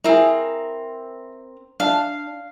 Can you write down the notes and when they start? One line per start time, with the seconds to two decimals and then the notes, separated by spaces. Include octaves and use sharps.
0.04 C4 E4 G#4 A#4
1.80 D4 F5 A5